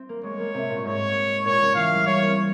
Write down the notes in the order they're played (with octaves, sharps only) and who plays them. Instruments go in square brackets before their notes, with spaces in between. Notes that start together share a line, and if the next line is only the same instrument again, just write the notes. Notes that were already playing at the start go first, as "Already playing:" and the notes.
Already playing: [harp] C4
A#3
[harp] G#3 [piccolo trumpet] C#5
[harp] A#3
C3
A#2
[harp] G#2 [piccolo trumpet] C#5
[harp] A#2 [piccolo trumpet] C#5
[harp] C#3
[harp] E3 [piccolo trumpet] F5
[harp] G3
[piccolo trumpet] C#5
[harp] A#3
C4